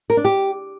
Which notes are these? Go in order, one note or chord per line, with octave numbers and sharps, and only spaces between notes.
A#4
D4
G4